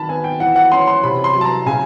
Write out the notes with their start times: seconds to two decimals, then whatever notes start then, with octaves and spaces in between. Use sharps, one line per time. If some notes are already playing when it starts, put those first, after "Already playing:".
Already playing: D#3 A5 B5
0.09 B3 G#5
0.24 G5
0.40 E3 F#5
0.56 F#5
0.72 C#4 C6
0.87 C6
1.03 C3 B5
1.24 C6
1.35 F#3
1.41 A5
1.45 A#5
1.66 C#3 G#5